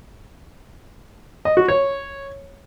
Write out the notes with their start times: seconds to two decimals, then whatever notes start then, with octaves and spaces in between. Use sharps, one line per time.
1.45 D#5
1.57 F#4
1.68 C#5